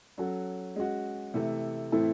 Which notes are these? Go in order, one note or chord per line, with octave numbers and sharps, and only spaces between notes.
F#3 C#4 F#4 A4
G#3 C#4 F#4
C3 E3 A3
A2 E3 C4 E4 A4